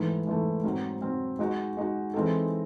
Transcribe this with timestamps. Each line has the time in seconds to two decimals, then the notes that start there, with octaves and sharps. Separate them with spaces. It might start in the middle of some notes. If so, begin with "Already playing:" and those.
Already playing: G#2 E3 A3
0.27 G#2 E3 A3
0.64 G#2 F#3 C4
1.01 G#2 F#3 C4
1.39 G#3 D#4 F#4
1.77 G#3 D#4 F#4
2.14 E3 G#3 C4 D#4 A4